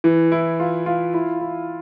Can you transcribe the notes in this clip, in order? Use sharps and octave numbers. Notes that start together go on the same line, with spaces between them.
E3
E4
F4
F4
E4
E4